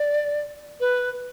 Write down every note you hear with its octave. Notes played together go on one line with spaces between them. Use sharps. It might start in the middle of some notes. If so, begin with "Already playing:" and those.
Already playing: D5
B4